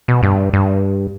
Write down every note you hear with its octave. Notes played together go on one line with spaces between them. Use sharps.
B2
G2
G2